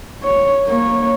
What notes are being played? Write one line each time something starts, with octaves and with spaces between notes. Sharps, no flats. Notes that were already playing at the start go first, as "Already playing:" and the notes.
C#5
A#3 C#5